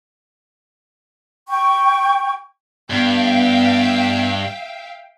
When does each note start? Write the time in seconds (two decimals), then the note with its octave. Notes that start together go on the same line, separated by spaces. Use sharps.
1.48 G5 C#6
2.90 G2 B3 E5 F5 G5